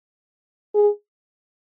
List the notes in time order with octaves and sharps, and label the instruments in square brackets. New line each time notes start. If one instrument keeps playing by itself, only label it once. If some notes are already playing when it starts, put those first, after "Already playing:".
[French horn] G#4